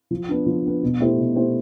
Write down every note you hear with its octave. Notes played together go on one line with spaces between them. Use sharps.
F3
B3 D4
F3
B3 D4
B2
A3 E4 G4 C5
B2
A3 E4 G4 C5